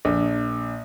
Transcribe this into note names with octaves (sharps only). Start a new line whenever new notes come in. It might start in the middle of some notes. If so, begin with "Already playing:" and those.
A#1